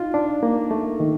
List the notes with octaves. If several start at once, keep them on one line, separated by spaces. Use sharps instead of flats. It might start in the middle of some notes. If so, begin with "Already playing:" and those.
Already playing: D#4 F4
D4
A#3
A3
D#3